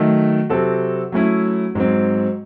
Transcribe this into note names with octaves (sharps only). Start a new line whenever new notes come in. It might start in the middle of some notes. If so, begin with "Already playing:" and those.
Already playing: D#3 F#3 A3
C3 F#3 C4 F#4 A4
F#3 A3 C#4 E4
G#2 F#3 C4